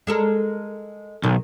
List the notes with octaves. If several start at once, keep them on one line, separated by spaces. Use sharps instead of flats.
G#3 A4 A#4
B1 D#3